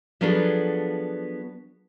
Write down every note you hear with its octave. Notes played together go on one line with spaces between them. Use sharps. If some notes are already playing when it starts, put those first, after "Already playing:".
F3 F#3 B3 D4 G#4 A4